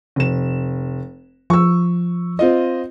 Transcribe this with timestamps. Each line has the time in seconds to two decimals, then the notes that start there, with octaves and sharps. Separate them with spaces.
0.16 F1 E7
1.50 F3 C#6 E6
2.39 C4 F4 D#5